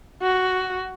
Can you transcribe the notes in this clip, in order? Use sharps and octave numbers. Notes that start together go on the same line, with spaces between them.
F#4